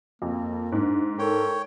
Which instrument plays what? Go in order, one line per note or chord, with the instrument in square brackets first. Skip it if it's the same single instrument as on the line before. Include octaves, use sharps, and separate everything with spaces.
[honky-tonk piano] F2 [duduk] A#3
[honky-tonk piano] G#2 [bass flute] D4
[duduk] A4 [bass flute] A#4 [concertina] C#5 G5